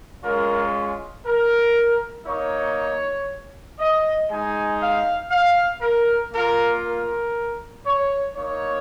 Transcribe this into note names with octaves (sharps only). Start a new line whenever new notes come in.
G#3 C#4 F4 A#4
A#4
A#3 D#4 C#5
D#5
G#3 D#4 G#5
F5
F5
A#4
A#3 F4 A#4
A#4
C#5
A#3 D#4 C#5